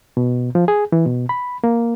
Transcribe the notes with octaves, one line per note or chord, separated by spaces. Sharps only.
B2
F3
G#4
E3
B2
B5
A#3